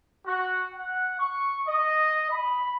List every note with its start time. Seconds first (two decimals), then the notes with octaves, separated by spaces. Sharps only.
0.27 F#4
0.75 F#5
1.19 C#6
1.67 D#5
2.30 B5